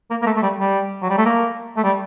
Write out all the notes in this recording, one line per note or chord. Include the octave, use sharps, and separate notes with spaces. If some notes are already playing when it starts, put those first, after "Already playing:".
A#3
A#3
A3
A3
G3
G3
F#3
G3
A3
A#3
A3
G3